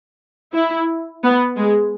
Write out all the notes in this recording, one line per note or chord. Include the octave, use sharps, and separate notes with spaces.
E4
B3
G#3